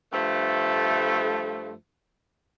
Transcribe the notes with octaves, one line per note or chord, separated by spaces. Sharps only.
G2 F3 A3